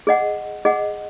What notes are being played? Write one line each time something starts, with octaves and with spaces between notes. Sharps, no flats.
G#4 D#5 F#5
G#4 D#5 F#5